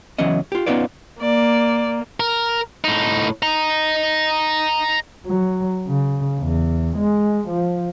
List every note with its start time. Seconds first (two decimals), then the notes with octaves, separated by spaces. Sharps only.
0.18 C#2 E3 F#3 B3 C#4 D#5
0.52 F4 G4
0.66 B3 C#4 D#4 F4 B4 D5
1.21 A#3 D5
2.20 A#4
2.84 A2 D#4
3.43 D#5 A#5
5.26 F#3
5.88 C#3
6.40 E2
6.97 G#3
7.48 F3